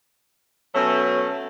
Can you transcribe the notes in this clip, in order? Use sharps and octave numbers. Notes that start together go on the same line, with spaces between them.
B2 F#3 A3 C#4